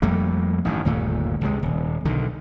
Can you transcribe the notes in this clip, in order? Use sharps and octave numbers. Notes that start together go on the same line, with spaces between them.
F2 G3 A3 A#3
A1 G2 D#3
G1 D#2 A#2 A3
C#2 C3 G#3
D#1
B1 D3 D#3